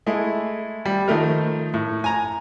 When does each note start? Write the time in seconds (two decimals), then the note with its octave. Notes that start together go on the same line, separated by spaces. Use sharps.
0.07 G#3 A3 E4
0.86 G3
1.08 D#3 F3 A3 A#4
1.74 A2
2.04 G#5 A#5